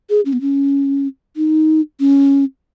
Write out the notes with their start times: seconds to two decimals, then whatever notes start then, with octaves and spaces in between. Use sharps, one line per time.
0.09 G#4
0.25 C#4
0.33 B3
0.41 C#4
1.36 D#4
2.00 C#4